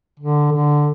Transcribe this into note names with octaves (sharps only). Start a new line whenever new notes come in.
D3
D3